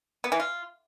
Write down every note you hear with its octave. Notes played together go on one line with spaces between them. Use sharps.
B3
E3
F4